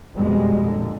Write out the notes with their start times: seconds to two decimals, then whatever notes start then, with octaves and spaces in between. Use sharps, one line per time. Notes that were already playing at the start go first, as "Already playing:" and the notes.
0.15 F2 B2 G3 G#3
0.65 A#2 D3